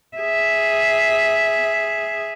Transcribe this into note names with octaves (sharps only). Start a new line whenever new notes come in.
G#4 E5